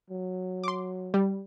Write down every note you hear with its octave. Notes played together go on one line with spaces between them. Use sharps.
F#3
C6 D6
G3